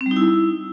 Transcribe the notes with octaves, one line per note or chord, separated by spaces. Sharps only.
C4
G3
D#4
E4